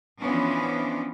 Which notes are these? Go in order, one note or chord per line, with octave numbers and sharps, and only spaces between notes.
E3 F3 B3 C#4 D4